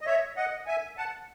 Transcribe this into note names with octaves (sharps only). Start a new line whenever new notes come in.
D#5
C#5 E5
D#5 F#5
E5 G#5
F#5 A5